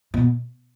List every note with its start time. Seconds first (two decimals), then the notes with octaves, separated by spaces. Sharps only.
0.14 B2